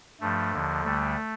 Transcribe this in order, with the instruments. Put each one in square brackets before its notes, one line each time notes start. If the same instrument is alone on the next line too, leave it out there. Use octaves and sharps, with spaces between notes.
[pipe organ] G2 F3 A3
D#2 D3 F3
D2 D3 G3 A3